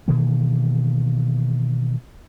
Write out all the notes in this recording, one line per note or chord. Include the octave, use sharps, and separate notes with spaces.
B2 D#3 E3 A#3